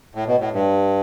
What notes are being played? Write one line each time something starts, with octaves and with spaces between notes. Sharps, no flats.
A2
B2
A2
G2